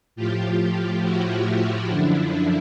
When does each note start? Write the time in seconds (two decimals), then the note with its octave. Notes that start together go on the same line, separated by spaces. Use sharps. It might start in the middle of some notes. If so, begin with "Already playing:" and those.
0.16 A2 F3 F4 G4
1.03 E4 F#4
1.89 F#2 D3 F3 D4 E4